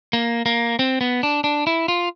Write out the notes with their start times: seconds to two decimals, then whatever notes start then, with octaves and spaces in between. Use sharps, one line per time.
0.13 A#3
0.46 A#3
0.79 C4
1.01 B3
1.23 D4
1.44 D4
1.67 E4
1.88 F4